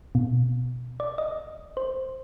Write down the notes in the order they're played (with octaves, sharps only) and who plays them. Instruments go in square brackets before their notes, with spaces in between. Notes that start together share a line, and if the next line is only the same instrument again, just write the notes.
[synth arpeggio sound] B2
D5
D#5
C5